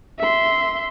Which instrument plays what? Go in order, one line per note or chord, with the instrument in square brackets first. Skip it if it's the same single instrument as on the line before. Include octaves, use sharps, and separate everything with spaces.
[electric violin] E5 C6